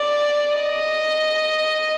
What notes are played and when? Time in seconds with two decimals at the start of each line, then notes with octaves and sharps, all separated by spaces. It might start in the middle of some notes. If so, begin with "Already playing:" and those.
Already playing: D5
0.56 D#5